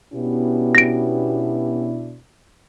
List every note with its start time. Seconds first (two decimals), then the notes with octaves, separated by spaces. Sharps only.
0.13 B2 B3 C#4 D4 E4 G4
0.75 A#6 D7